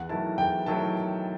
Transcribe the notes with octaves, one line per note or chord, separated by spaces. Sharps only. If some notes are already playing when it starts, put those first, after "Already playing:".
Already playing: E2 F#5
D#3 F#3 A3 E4 A5
E2 G5
D#3 F#3 A3 E4 A5